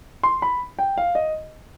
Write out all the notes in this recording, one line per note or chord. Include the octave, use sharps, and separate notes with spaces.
C6
B5
G5
F5
D#5